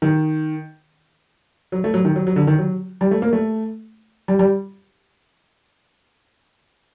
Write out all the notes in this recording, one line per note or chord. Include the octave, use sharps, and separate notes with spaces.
D#3
F#3
A3
F#3
D#3
F#3
F#3
D3
D#3
F#3
G3
A3
A#3
A3
G3
G3